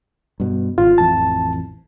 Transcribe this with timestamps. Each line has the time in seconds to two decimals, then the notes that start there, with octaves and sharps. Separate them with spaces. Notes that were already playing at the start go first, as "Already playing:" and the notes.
0.40 G2 B2
0.78 G#1 F4
0.98 A1 F2 E3 A5